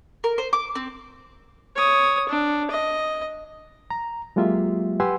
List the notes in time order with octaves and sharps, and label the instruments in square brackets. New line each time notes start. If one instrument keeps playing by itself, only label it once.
[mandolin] A#4
C5
D6
C4
[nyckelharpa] C#5 D#6
D4
D#5
[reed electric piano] A#5
F#3 G#3 A#3 F4 G4 E5
G4 B4 F#5 G#5 C6 E6